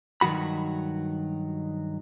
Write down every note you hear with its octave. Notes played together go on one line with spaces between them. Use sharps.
G2 D#3 F#3 F#4 B5